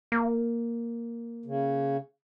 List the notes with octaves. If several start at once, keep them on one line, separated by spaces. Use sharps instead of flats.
A#3
C#3